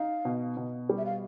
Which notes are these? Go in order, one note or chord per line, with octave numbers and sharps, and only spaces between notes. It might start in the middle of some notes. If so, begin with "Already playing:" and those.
Already playing: D#4 F5
B2
B2
G3
E5
F5